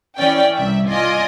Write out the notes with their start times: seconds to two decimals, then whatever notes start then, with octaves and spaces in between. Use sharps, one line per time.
0.18 E3 C#4 D5 G5
0.56 C2 E5
0.88 F4 D5 D#5 G#5